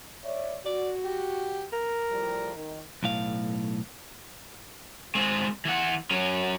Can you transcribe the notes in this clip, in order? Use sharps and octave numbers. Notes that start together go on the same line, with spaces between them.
C#5 D5 E5
F#4 D5
G4
A#4
A2 F3 G3
D#3
B1 A2 F5
G#3 C4
E3 F#5
F#3 C#4